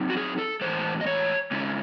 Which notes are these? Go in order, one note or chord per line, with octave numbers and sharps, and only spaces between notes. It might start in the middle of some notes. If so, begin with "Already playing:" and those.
Already playing: F#3 C4 D#4
F#4
G#4
A4
A2 E3 G#3 C5
D#5
C#5
C#3 G#3 C#4 E4